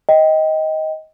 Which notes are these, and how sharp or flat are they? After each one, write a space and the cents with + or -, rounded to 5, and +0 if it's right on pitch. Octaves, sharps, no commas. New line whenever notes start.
D#5 +15 G5 +0